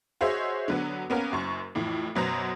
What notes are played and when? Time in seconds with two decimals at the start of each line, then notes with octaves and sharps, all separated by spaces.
0.21 F#4 G#4 C5 C#5 D#5 E5
0.68 D3 F#3 B3
1.10 A#3 B3 C#4 A#4
1.31 F#1 F#2 C#6
1.75 F2 A2 E3
2.15 F#2 B2 F#3 B3 C5 A#5